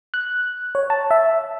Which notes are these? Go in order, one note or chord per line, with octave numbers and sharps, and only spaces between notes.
F#6
C#5
A5
E5